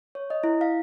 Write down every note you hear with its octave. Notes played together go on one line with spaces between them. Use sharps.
C#5
D#5
E4
F5